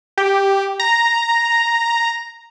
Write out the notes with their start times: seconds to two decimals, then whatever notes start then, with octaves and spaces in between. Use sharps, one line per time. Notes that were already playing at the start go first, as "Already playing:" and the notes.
0.18 G4
0.80 A#5